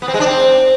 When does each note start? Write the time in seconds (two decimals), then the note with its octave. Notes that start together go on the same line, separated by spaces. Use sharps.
0.02 B3
0.08 C4
0.14 G#3
0.20 D4
0.26 C4